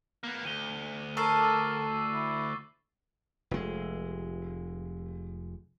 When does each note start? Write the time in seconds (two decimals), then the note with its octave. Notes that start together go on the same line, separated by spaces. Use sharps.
0.23 A#3 B3
0.45 D2 D#7 G7
1.17 A4 A#4 C#6 E6 C7
1.41 D6 E6 A6
2.12 E4
3.51 F1 G#3